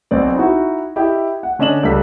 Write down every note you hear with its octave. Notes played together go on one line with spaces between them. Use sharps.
B1 C4 D5
D#4 E4 F#4
E4 G4 D#5 E5 G5
F#5
D3 C#4 D4 D#5 E7 F#7
C#2 G3 A4 B6